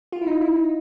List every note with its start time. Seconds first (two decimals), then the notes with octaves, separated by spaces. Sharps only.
0.12 F4
0.21 E4
0.27 D#4
0.41 E4
0.56 D#4